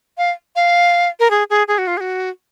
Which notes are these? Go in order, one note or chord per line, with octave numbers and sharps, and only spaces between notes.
F5
F5
A#4
G#4
G#4
G#4
F#4
F4
G#4
F#4